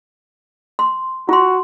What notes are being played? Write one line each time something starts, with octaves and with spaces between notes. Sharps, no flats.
C6
F4 F#4 C6